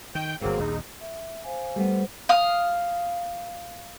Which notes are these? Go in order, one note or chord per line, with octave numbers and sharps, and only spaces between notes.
D#3 G5 G6
G1 G2 F#3 A#3 C4 G#4
A#1 D#2 D#4
E5
C5 F5 G#5
G3 A3 B3 C5
F5 D#6